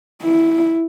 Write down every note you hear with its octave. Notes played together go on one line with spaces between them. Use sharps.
E4